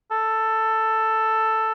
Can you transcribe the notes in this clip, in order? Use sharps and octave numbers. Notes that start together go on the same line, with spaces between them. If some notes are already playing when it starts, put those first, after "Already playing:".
A4